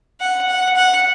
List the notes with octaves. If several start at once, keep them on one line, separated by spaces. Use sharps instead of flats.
F#5
F#5
F#5